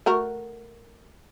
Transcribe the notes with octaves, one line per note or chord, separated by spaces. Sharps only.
A3 F#4 A#4